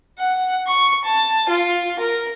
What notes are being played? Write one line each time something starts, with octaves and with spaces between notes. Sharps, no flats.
F#5
C#6
A5
F4
A#4